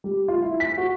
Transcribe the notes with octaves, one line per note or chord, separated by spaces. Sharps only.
G3
F4
E4
B6
F#4